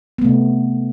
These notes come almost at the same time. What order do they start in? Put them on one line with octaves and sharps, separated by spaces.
B3 A3 C3